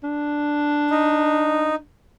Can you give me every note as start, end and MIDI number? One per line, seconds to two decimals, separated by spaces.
0.03 1.81 62
0.90 1.75 63